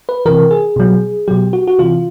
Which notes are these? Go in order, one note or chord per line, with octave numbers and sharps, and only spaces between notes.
B4
C3 E3 A#4
G#4
B2 F#3
B2 F#3 G4
F#4
F#4
C3 E3 F4